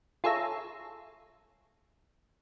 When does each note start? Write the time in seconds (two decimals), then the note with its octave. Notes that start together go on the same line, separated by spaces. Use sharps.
0.24 F4 G#4 A4 C#5 E5 A#5